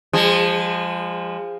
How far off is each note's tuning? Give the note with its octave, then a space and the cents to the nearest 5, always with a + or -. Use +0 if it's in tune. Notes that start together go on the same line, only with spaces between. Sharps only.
F3 +0 G#3 -30